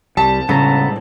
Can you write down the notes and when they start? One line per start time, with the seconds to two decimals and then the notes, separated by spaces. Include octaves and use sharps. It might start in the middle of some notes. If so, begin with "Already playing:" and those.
0.17 C2 G3 A5
0.49 C#2 A2 C#3 G3 G#3 B3 A4 A#5